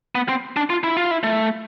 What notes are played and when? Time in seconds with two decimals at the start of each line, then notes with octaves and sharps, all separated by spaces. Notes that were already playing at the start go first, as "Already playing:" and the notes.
0.15 B3
0.29 C4
0.56 D4
0.70 F4
0.84 E4
0.97 F4
1.11 E4
1.23 A3